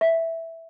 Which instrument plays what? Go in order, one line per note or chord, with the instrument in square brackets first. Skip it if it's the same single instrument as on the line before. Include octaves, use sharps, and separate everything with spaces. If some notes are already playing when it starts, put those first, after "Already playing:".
[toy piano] E5